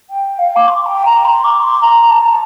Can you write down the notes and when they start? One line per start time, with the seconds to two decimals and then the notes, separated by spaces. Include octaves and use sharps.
0.09 G5
0.38 F5
0.55 D6
0.67 C6
0.86 G5
1.05 A#5
1.24 C6
1.44 D6
1.62 C6
1.81 A#5
2.10 A5